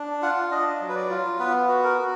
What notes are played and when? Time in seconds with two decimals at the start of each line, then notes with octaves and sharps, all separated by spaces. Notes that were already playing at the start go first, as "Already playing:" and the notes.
Already playing: D4
0.22 F4 F#5
0.51 D4 D#5
0.81 F#3
0.89 B4
0.95 D5
1.10 F4
1.39 B3 B4
1.68 F#4
1.84 A#4
1.98 F#4